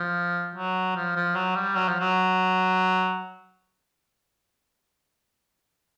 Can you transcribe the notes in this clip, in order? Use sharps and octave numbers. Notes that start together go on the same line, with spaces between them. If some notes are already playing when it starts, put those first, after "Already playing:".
Already playing: F3
F#3
F3
F3
F#3
G3
F#3
F3
F#3